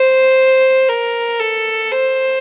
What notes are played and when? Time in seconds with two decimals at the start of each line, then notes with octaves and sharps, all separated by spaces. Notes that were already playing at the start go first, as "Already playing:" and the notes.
Already playing: C5
0.89 A#4
1.40 A4
1.91 C5